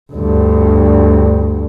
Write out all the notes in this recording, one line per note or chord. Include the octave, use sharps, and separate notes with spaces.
D2 G2